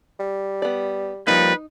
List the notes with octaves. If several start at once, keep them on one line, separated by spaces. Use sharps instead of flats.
G3
B3 D5
F3 G3 A#3 D#4 B4